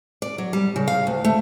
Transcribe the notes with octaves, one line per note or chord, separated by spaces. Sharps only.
D5
F#3
G3
C#3
F5
D2
A3